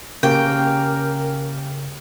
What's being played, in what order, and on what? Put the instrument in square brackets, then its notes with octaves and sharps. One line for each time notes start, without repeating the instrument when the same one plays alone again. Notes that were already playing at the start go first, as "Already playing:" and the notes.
[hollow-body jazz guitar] C#3 [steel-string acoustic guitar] A#3 G4 [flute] A#4 [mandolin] G5